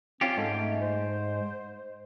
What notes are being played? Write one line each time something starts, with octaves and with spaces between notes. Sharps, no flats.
C4 C#4 F4 G4
G#2 A4
A3
C5